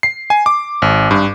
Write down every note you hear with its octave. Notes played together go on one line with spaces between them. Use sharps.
C7
G#5
D6
G#1
G2